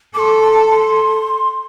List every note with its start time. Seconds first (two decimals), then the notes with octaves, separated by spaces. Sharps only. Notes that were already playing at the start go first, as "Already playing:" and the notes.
0.14 A4 C6 D6
0.42 A5
0.71 C6